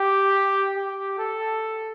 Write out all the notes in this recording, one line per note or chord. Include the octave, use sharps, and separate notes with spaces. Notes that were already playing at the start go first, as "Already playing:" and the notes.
Already playing: G4
G4
A4